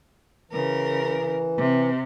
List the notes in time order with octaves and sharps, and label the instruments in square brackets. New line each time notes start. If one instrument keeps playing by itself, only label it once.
[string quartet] C#3 A#4 [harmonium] E3
[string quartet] C3